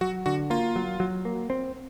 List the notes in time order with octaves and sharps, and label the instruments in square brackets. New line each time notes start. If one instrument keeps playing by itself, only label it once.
[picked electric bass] F#3 [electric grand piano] F#4
[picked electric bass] D3 [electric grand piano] F#4
[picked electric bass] A#3 [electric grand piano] F4
[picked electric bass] F#3
F#3
A#3
C4